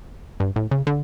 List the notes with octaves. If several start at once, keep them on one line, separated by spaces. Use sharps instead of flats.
G2
A2
C#3
D3